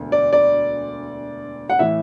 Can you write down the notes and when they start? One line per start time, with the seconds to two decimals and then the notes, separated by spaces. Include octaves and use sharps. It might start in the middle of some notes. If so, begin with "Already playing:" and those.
Already playing: E1 D2 D3
0.12 D5
0.33 D5
1.70 F#5
1.79 A2 E3 E5